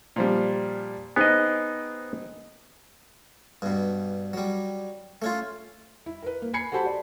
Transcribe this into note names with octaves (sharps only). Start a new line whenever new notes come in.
A#2 F3 G3
B3 C4 D#4 G#4 D#5
G2 B2
F#3 G3
A3 C#4 F4
E4
A#4 B4
A#3
G#5 B5 G#6 C7 C#7
F#4 G4 A4 C5 A5 B5
D5